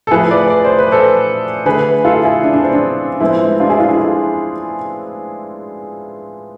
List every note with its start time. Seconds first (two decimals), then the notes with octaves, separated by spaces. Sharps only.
0.07 A4
0.11 A2 F3 A3 G#4 B4
0.31 B4 D5
0.50 D5
0.65 C5
0.79 B4
0.91 A4 C5
1.66 D3 A3 G#4 B4
2.05 F4 A4
2.24 E4 G#4
2.44 D4
2.54 D4
2.62 C4
2.73 D4
3.20 A2 F3 G#3 B3 C4 E4
3.40 C4 E4
3.60 D4 F4
3.69 E4 G#4
3.79 D4 F4
3.89 E4 G#4
3.98 F4 A4